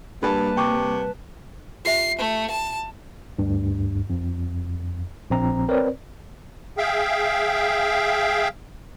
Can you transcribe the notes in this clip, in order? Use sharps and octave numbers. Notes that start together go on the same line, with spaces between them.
G2 G3 A#3 B4 A5
C3 G5 C#6 D6
F4 G4 E5 C7
A3
A5
D2 G2
F2
A#1 C4 A#5
C4 A#4 B4 C#5 D5
G#4 E5 F5 G5